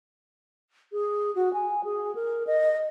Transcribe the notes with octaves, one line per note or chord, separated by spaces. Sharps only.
G#4
F#4
G#5
G#4
A#4
D#5